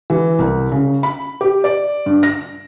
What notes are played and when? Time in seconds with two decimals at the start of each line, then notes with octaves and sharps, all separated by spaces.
0.10 E3
0.39 C2
0.72 C#3
1.03 B5
1.41 G4
1.64 D5
2.06 G2
2.23 A#6